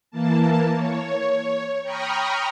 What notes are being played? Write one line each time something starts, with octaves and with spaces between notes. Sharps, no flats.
E3 A#3 A5
C#5
G5 A#5 B5 C#6 D#6 F6